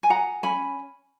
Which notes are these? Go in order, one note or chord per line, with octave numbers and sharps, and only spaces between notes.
G#5
G#4 F#5 A#5
C#4 G#5 B5